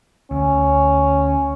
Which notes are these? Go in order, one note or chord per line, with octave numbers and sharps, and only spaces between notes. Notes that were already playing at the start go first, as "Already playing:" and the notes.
D2 C#4